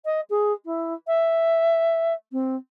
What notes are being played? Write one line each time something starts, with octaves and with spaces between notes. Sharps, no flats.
D#5
G#4
E4
E5
C4